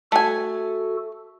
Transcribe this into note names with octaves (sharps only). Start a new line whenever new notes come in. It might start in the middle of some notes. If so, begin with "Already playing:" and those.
A3 F#4 A4 G#5